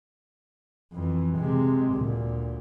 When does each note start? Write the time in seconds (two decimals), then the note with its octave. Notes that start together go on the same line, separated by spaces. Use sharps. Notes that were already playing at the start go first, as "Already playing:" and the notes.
0.93 F2 E3
1.37 C3 G#3
1.95 D2 A#2